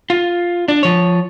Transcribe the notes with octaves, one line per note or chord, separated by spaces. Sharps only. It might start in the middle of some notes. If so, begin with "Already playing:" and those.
F4
D4
F3 C#5